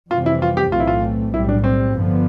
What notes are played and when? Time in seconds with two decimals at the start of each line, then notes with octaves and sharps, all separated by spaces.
0.11 F2 C3 E3 G3 C4 F4
0.26 E4
0.42 F4
0.57 G4
0.72 B1 A2 E3 A3 C4 F4
0.80 E4
0.87 F4
1.33 B1 A2 G3 E4
1.49 D4
1.64 C4
1.95 G1 G2 D3 F3 B3